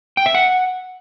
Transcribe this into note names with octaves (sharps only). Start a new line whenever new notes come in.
G5
E5
F#5